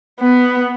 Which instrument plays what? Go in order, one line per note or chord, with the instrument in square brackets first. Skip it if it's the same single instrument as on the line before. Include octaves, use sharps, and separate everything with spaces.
[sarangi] B3